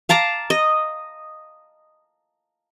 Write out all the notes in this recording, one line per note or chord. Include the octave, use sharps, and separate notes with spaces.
F5 A5 A#5 D6
D#5